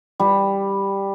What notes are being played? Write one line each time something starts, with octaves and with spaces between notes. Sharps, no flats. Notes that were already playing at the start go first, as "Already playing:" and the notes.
G3